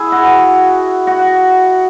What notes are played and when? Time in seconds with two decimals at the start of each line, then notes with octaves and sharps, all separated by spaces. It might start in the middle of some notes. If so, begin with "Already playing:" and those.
Already playing: E4 G#4
0.12 F#4
1.07 F#4